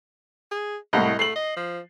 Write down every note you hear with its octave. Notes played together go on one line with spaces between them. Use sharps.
G#4
C2 A2 D#5
A3 C7 F#7
D#5
F3